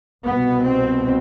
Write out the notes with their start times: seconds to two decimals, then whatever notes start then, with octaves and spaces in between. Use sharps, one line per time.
0.24 C2 B2 B3
0.64 C4